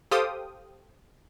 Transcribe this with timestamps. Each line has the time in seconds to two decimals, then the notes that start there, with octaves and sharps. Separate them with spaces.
0.11 G4 A4 C5 F5 G5 D#6